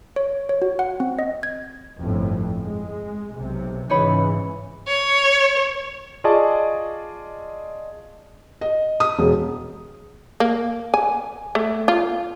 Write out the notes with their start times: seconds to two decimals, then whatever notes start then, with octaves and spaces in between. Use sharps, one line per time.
0.16 C#5
0.49 C#5
0.62 F#4
0.79 F#5
1.00 C4
1.19 D#5
1.43 G#6
2.00 G1 F2 A2
2.61 G#3
3.36 B1 C3
3.90 G#2 C#3 E3 D#4 C#5 B5
4.88 C#5
6.24 F4 G#4 D5 D#5 A5 C#6
8.61 D#5
9.00 D#6
9.19 E1
10.40 A#3
10.94 G#5
11.55 A3
11.88 F4